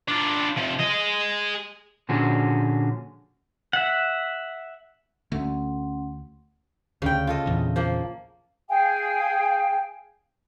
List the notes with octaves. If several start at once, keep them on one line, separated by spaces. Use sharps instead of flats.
D4 F4
C3 F3
G#4 D#5
A#2 D3 F3 C#4 F#4 G#4
E5 F#5
D2 A3 C#4 F#5 C6
D2 C#3 G5
F4 A4 D#5
A#1 E2
F3 A#3
G#4 F5 G5 G#5